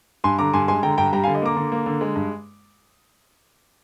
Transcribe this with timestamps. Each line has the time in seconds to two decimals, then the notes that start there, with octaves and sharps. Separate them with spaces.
0.24 G2 G#5 C6
0.39 D3 A#5 D6
0.53 G2 G#5 C6
0.68 G#3 G#5 C6
0.83 D3 G5 A#5
0.98 G2 G5 A#5
1.13 G3 G5 A#5
1.24 F5 G#5
1.27 D3
1.35 D#5
1.42 A#3 A#5 D6
1.57 D3
1.72 A#3
1.86 D3
2.01 G#3
2.16 G2